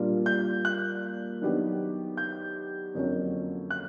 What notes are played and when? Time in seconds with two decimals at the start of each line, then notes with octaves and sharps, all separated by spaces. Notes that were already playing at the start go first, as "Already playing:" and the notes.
Already playing: A#2 G3 A#3 D4 F4
0.26 G6
0.65 F#6
1.41 D#3 F#3 B3 D4 G4
2.17 G6
2.94 F2 D3 F#3 A#3 C#4
3.70 F#6